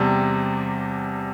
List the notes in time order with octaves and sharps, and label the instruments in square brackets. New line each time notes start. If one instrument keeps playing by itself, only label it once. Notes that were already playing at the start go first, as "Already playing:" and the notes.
Already playing: [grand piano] E2 C3 G3 A5